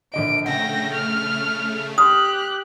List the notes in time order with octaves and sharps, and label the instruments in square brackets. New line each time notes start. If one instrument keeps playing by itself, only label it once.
[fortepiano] A#1 D3 D#5 [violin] D7
[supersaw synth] C#3 A3 [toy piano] F#5 [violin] G5 A#6
[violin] F6
[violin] G4 F#6 [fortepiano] C6 F6 [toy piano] D#6